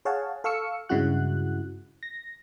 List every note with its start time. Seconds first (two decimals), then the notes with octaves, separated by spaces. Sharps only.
0.05 G#4 C#5 F5 F#5 A5
0.44 A4 F5 C#6 E6 C#7
0.89 G2 C#3 G#3 E4 F#4 F#6
2.03 A#6